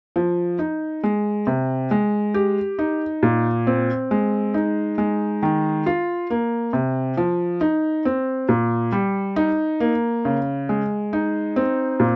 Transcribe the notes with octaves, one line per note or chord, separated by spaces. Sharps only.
F3
D#4
G#3
C3
G#3
G4
D#4
A#2
C4
G#3
D#4
G#3
D#3
F4
A#3
C3
F3
D#4
C4
A#2
G3
D#4
A#3
C#3
G#3
D#4
C4
A#2